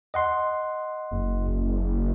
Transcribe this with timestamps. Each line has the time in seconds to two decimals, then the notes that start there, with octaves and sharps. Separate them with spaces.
0.14 D#5 F#5 C6
1.11 F#1